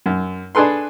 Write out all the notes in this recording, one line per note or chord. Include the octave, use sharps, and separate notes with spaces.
F#2
D4 G#4 A4 B4 C6